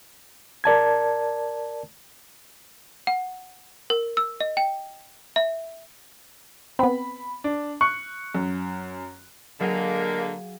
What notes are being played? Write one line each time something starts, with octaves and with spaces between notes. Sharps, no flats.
A#4 D5 A5 G#6
F#5
A#4
E6
D#5
G5
E5
B3 C4 B5
D4
C#6 F#6 C#7
F#2
D3 F#3 G#3 A#3 G#4 F5